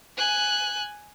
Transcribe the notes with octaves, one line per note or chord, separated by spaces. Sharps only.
G#5 F#6